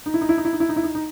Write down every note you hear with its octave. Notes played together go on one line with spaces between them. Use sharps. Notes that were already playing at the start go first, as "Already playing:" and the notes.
D#4
E4
D#4
E4
D#4
E4
D#4
E4
D#4
E4
D#4
D#4